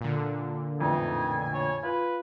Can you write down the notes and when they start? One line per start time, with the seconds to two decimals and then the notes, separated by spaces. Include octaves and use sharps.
0.01 A#2 D3
0.81 F2 A2 E3 D#4 G#5
1.54 C#5
1.83 F4 B4